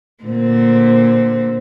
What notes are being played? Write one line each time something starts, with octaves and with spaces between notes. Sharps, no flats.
A#2 D3 C4